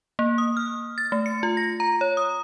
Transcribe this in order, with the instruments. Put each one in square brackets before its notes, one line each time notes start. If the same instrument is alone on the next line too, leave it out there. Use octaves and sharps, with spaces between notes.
[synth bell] A#3
D#6
F6
A6
A3
C#7
F4
A#6
A#5
C#5
D#6